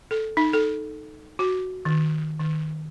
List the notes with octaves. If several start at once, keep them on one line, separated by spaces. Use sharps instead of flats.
A4
D#4
A4
F#4
D#3
D#3